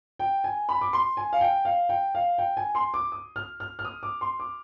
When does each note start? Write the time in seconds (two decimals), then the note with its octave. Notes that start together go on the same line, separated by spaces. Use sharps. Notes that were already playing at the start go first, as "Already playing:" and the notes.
0.19 G5
0.44 G#5
0.69 B5
0.81 D6
0.93 C6
1.17 G#5
1.33 F5
1.41 G5
1.65 F5
1.89 G5
2.15 F5
2.38 G5
2.57 G#5
2.75 C6
2.94 D6
3.12 D#6
3.36 F6
3.60 F6
3.79 F6
3.85 D#6
4.03 D6
4.21 C6
4.40 D6